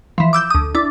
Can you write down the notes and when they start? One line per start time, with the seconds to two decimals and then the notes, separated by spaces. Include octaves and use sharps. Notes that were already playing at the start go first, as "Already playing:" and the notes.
0.18 E3 F3
0.33 D6 E6 G6
0.50 D2 D#6
0.75 D4 E4